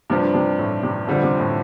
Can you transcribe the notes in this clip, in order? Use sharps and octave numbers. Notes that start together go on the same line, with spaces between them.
G2 C3 F3 D4
C3
A2
C3
F2 D3 G3 C4
C3
A2